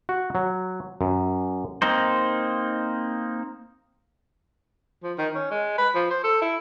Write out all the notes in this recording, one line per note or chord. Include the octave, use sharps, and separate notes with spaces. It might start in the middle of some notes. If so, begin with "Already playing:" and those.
F#4
F#3
F#2
A#3 C4 D#4 C5
F3
D#3
C#4
G#3
B4
F3
C5
A4
E4